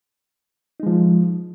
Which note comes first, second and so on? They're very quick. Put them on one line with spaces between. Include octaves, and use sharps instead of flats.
D#4 G#3 F3